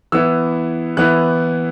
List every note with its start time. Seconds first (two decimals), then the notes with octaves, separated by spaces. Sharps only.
0.12 E3 B3 E4 E6
0.97 E3 B3 E4 F#6